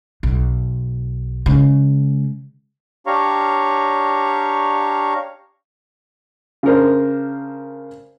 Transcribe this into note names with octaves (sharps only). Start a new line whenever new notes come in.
B1
C#3 G#3
D4 G4 C#5 F5 A#5 C#6
C#3 D4 A#4 C5